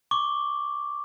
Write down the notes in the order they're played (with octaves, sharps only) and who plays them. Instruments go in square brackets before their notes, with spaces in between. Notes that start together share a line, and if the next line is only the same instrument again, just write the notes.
[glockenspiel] C#6 D6